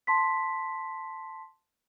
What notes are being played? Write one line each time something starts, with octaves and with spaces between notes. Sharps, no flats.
A5 C6 B6